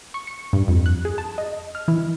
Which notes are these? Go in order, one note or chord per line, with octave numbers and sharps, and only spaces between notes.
C#6
C#7
G2
F2
F#6
G#4
A5
D#5
F6
E3